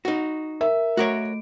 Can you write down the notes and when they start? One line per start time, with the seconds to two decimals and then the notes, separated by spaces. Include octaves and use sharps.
0.05 D#4 F#4
0.61 A#4 E5
0.97 A3 F#4 A#4 C#5 D7